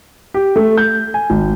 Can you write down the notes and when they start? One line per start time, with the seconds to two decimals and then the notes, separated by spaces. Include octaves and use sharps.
0.34 G4
0.56 A3
0.78 G6
1.14 G#5
1.30 G#1